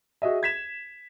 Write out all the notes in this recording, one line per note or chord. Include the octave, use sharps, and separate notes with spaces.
F#4 G#4 D#5 E5
G#6 B6 E7